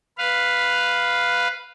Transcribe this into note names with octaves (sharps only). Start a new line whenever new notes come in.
B4 F5